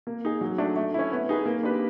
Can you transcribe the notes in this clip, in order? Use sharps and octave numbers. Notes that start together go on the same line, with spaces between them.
A#3
D#4 G#4
F#3
A3 D4
A3
C#4 E4
B3
D#4 G#4 B4
A#3
D4 G4 B4